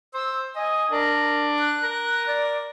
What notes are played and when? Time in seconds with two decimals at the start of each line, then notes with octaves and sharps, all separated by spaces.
0.14 C5 E6
0.56 D#5 G#5
0.91 D4 A#4
1.59 F#6
1.84 A#4
2.27 D5